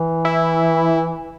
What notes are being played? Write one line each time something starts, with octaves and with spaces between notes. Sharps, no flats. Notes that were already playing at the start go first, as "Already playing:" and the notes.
Already playing: E3
E4